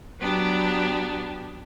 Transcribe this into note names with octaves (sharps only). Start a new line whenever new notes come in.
F#3 B3 D4 G4